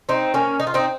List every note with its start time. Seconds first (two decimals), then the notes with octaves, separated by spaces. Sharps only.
0.09 C4 D#4
0.34 A#3 C#4
0.60 D#4
0.67 F4
0.74 C4 D#4